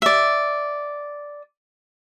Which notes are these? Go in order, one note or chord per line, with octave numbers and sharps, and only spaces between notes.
D5 E5